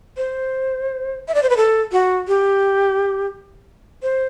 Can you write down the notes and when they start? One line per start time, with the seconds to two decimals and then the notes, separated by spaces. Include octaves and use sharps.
0.17 C5
1.28 E5
1.35 D5
1.43 C5
1.50 B4
1.57 A4
1.92 F#4
2.28 G4
4.03 C5